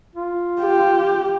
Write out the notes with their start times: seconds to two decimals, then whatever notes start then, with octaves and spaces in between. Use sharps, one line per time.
0.15 F4
0.60 G4